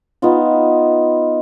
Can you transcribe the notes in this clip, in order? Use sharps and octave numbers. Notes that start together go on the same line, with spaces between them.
B3 D#4 F4